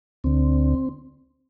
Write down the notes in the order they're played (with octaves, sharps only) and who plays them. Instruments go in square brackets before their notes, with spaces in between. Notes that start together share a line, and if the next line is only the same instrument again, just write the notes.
[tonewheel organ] D2 D3 C4